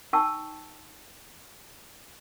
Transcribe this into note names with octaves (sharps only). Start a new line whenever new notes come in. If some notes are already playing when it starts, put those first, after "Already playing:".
D#4 G5 A5 C#6 E6